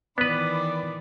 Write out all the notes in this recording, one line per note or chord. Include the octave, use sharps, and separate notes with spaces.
D#3 E3 B3 B4 D5 B5 D6